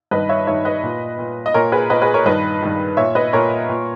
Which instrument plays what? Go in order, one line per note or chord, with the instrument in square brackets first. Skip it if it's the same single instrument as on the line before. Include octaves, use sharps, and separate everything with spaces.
[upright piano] G2 D#3 B4 D#5
C#5 E5
G2 D#3 C#5 E5
B4 D#5
A#2
A#2
D#5
A#2 A#4 C#5
G#4 B4
A#2 B4 D#5
G#4 B4
A#4 C#5
G2 D#3 B4 D#5
G2 D#3
A#2 C#5 E5
B4 D#5
A#2 A#4 C#5
A#2